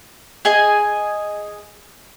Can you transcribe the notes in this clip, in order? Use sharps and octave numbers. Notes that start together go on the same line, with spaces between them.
G#4 D#5 G#5